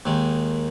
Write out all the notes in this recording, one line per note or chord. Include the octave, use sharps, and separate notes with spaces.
D#2 D#3 G#3